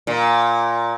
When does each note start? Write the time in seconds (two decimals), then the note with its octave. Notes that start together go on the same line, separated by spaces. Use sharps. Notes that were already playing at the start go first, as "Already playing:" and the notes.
0.07 A#2